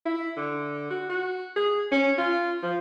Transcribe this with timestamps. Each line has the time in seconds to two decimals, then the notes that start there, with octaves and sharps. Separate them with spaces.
0.06 E4
0.37 D3
0.90 F#4
1.09 F#4
1.56 G#4
1.92 C#4
2.18 F4
2.63 F3